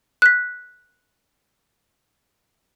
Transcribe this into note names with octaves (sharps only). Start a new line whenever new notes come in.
F#6 B6